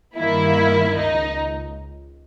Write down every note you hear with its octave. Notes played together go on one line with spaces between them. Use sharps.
G2 D#3 A#3 E4
C#2 D#4